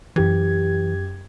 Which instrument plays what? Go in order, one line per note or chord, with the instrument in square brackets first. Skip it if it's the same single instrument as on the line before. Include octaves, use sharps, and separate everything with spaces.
[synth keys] F#2 G4 G#6 [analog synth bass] E3